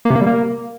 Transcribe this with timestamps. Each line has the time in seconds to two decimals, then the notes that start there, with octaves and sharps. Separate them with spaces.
0.05 A#3
0.10 C3
0.16 A#3
0.21 G3
0.27 A#3